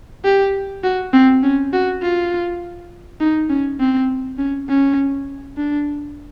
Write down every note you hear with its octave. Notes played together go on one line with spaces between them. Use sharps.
G4
F#4
C4
C#4
F#4
F4
D#4
C#4
C4
C#4
C#4
D4